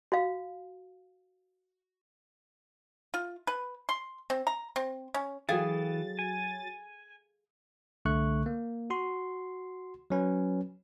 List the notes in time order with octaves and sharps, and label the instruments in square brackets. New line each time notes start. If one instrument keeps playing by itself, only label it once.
[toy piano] F#4 F5
[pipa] F4
B4
C6
C4
A#5
C4
C#4
[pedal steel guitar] E3 [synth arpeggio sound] F#3 A6 [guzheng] G#4 [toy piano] A4 F5 G5
[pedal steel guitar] G#5
[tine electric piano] C2 D3 A3 C#6 F#6
A#3
F#4 C6
F#3 C#4 B4